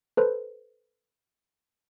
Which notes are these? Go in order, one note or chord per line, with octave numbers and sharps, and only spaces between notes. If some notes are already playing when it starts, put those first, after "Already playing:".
A4 B4 C5